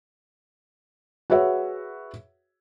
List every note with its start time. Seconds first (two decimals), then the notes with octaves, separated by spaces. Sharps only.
1.30 F#4 G#4 B4 C#5 E5 F#5